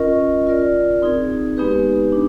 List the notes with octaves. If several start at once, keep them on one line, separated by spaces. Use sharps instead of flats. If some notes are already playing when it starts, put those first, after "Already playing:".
Already playing: C#4 F4 A#4 D#5
F4 A#4 D5
C4 D#4 G#4
G#3 B3 D#4 G4 B4
D4